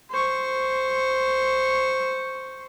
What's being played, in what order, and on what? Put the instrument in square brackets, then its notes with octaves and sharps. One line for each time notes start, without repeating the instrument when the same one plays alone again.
[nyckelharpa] C5 C#6